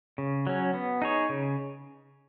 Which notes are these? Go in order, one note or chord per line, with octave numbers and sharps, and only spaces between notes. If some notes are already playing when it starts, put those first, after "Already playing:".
C#3
F#3 C#4
B3
D#4 G#4 C#5
C#3